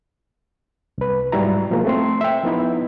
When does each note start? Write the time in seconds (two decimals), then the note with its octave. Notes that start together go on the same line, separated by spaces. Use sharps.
0.98 C2 B4
1.32 G#2 F#3 G3 E4 A#5
1.71 B2 F3 G#3 A#3
1.85 A3 C4 C6
2.21 E5 G5
2.44 F3 B3 D#4 E4